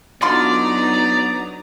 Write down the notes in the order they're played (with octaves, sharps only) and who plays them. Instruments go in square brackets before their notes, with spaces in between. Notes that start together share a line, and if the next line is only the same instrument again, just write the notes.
[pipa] D3 F4 C6 [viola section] F#3 D#4 A#5 [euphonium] B3 [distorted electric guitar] D5